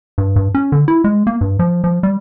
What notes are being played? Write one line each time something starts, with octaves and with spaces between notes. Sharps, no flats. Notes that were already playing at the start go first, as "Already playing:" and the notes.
G2
G2
C#4
D3
E4
G#3
A#3
G2
F3
F3
G3